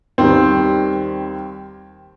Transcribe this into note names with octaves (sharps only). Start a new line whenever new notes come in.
D#2 D#3 G3 C4